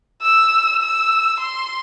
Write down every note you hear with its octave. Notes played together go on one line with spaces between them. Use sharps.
E6
E6
C6